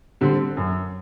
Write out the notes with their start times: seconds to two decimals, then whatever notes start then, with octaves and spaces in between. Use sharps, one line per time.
0.21 D3 G3 C4
0.57 F#2